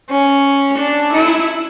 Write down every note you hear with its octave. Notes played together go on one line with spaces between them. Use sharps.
C#4
D4
E4